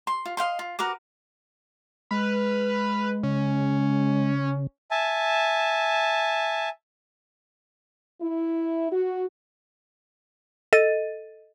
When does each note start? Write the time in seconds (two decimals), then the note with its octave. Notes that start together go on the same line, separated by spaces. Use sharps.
0.07 C6
0.25 F4
0.37 D#5 F5 G5 C6
0.59 F4
0.79 F#4 A#4 B4 D6
2.11 G#3 B4 F6
3.23 C#3 C#4
4.91 E5 G#5 A5
8.21 E4
8.92 F#4
10.73 A4 D#5 A6 D#7